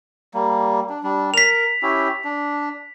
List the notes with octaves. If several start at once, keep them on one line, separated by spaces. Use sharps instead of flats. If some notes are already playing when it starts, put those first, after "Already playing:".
G3 A#3
D4
G3 D4
A#4 B6 F7
C#4 E4 G4
D4